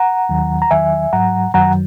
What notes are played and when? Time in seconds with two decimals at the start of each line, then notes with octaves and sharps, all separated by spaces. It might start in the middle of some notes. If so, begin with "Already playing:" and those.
Already playing: F#5 A#5
0.29 D#2 D#3 F#3
0.62 A#5
0.71 E2 D#3 F#3 E5 G#5
1.13 G#2 F#3 F#5 A#5
1.54 F#2 D#3 F#3 F#5 A#5